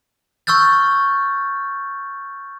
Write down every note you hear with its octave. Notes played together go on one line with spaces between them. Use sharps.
C#6 E6 F6 G6 A6